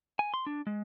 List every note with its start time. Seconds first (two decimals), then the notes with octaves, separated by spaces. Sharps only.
0.19 G#5
0.34 C6
0.47 D4
0.67 G#3